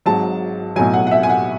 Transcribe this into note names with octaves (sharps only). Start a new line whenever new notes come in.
G#1 G#2 F#3 A5
B1 A2 F#3 G#5
F#5
F#5
E5
G#5
F#5